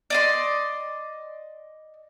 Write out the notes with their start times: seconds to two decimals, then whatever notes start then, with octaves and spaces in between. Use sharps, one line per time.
0.10 D5 D#5 C6